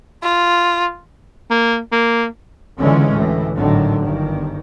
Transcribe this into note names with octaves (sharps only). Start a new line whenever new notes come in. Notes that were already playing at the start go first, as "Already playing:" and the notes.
F4
A#3
A#3
C#2 D3 E3 G#3 C#4
D2 A2 E3
G#1 A2 D3 D#3 F#3
G1 G2 D#3